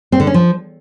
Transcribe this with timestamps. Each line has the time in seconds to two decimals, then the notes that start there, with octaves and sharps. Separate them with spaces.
0.12 C4
0.20 D3
0.27 C#4
0.34 F3